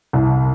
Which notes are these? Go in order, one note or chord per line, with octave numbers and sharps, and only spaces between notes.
C2